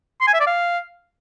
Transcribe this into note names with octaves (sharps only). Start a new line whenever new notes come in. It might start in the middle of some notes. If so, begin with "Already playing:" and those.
C6
G#5
E5
D5
F5